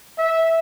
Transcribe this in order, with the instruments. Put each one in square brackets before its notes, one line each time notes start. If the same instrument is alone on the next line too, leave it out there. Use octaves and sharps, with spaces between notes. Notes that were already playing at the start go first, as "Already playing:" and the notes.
[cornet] E5